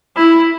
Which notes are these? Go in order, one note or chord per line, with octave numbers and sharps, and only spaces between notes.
E4